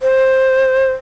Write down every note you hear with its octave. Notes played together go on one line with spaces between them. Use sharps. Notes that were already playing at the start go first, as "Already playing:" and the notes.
C5